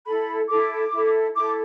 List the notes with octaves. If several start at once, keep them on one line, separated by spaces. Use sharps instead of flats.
E4 A4 B5
E4 A4 D6
E4 A4
E4 A4 D6